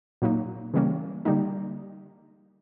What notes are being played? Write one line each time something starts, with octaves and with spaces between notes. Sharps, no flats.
A#2 F#3 A#3 D#4
C#3 E3 G3 A#3 C#4
D3 G3 A#3 D#4